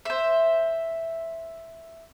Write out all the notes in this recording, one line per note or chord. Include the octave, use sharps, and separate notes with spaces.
C5 E5